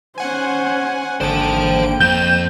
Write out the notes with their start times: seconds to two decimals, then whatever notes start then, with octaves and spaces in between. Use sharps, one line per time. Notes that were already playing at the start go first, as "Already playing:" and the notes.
0.18 C#4 C5 F#5 G#5
1.21 G#1 D3 A#3 C5 G5 A5 D7
2.00 F2 C4 G6 E7